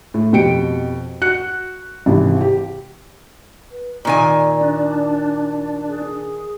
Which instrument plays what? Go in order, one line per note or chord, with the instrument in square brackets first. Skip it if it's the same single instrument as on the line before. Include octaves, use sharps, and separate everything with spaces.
[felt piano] A2
F2 B2 G4 G5 C#7 D7
F#4 F#6 C#7
G#1 C3 E3
G4
[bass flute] B4
[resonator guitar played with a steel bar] A#2 D#3 G#5 [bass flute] D5
[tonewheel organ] D4
[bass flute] G#4